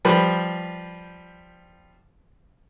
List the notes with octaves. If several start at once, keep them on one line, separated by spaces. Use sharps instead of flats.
F3 G3 B4